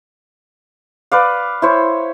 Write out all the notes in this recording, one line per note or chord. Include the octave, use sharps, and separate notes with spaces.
B4 D5 F5
E4 C5 C#5